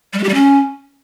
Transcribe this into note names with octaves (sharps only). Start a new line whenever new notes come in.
G3
G#3
G4
G3
C#4